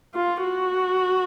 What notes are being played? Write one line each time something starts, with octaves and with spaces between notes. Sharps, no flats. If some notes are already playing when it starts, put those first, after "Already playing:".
F4
F#4